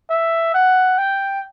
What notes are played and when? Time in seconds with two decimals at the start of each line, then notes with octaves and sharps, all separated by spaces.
0.10 E5
0.54 F#5
0.98 G5